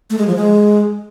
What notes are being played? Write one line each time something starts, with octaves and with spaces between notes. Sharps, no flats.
A3
G#3
F3
G#3